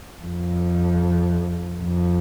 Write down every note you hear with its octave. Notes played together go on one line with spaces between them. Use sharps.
F2
F2